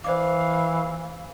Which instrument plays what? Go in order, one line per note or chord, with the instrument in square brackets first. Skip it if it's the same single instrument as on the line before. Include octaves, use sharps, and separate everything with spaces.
[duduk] E3 [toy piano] C5 D5 D6 [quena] F5